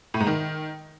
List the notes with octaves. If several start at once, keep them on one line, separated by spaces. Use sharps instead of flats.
A2
G#2
D#3